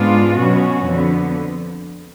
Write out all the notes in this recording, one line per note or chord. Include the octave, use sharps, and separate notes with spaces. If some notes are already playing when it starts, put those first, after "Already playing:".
Already playing: G#2 G#3 B3 D4 F4
B2 F#3 C#4 F#4
F2 D3 F3 B3